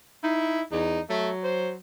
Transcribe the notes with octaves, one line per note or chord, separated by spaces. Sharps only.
D#4 E4
E2 D#4
F#3 A3
C5